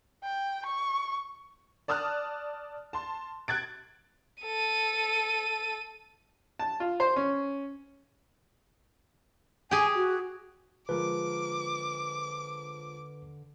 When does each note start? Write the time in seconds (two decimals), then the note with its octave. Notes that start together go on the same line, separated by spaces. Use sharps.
0.24 G5
0.66 C#6
1.88 D5 A5 D#6 F6 F#6
2.93 A5 C6
3.48 F#6 G#6 A6 D7
4.42 A4 D#7
6.59 A5
6.80 F4
7.00 C5
7.16 C#4
9.71 G4 G#4 G#5
9.95 F#4
10.89 D3 F3 G#3 A#4 B4 D6